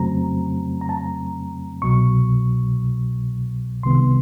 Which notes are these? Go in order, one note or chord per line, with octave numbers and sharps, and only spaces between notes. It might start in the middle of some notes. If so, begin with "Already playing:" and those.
Already playing: F2 C#3 F#3 A3 C4 A#5
A#5
A5
A#5
C2 B2 F#3 C#6
C2 C3 D#3 G3 B3 C6